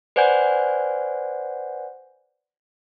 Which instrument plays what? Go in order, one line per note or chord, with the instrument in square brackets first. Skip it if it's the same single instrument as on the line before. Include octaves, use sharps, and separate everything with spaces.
[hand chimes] B4 C5 D5 F#5 G#5 G6